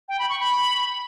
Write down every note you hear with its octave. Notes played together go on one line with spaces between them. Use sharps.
G5
B5
C#6
B5